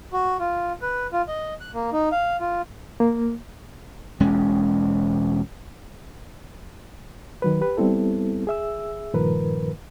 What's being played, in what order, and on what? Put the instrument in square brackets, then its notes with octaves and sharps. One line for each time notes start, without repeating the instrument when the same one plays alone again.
[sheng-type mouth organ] F#4
F4
B4
F4
D#5
F#6
A#3
D#4
F5
F4
[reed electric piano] A#3
[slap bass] E1 G#3 C#4
[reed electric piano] D#3 F#3 B4
G4 B4
G3 B3 C4 E4 A4
G#4 E5 E6
G2 A#2 D#3 F3 A#4 B4